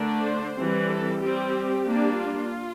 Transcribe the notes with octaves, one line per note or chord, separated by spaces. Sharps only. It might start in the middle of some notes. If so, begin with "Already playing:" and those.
Already playing: D3 A3 D4 A#4
C5
E3 G3 C4
A4
G3 C4 G4
G3 A#3 D4
F4